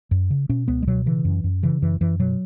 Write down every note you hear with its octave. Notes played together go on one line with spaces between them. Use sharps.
F#2
C#3
B2 C#4
C#2 B3
G#3
B2 F#3
C#3 E3
F#2
F#2
C#3 E3
F#2 E3
F#2 E3
B2 F#3